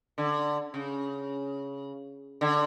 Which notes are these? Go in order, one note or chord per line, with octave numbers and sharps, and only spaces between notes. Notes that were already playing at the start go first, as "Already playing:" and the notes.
D3
C#3
D3